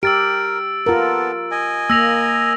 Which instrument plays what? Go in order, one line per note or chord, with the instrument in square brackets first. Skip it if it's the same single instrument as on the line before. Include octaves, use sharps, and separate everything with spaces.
[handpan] G4 [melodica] A#4 [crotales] E6 A6 D7
[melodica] B3 A4 [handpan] F4 A#4
[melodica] D#5 G#5
[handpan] A#3 [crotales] E6 A#6 F7